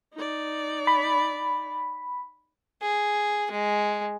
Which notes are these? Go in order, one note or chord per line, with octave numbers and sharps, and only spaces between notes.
D#4 D5
B5
G#4
G#3